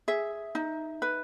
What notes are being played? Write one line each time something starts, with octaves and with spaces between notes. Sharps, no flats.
G#4 E5
D#4
B4